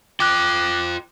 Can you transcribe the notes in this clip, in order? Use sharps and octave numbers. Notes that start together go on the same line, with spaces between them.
F4 G5 D6 F#6